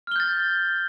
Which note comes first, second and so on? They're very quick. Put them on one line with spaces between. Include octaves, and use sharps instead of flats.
F6 G7 G6 A6